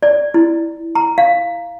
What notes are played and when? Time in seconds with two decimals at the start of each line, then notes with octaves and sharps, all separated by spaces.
0.03 D5
0.34 E4
0.95 A#5
1.18 F5